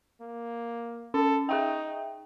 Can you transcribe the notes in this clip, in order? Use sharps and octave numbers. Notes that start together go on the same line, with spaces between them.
A#3
C#4 A4
D#4 G#4 E5 G5